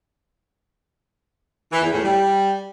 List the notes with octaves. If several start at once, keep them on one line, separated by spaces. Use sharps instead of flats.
E3
E2
A2
G3